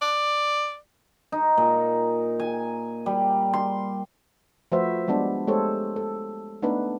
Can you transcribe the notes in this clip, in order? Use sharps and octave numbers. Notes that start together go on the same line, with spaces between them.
D5
D#4
A#2
G#5
G3
C6
F3 A3 F#4 B4 C5 E5
G3 G#3 B3 D4 D5
G#3 A3 G4 A4 C5 C#5
A4
A3 B3 D4 D#4 B4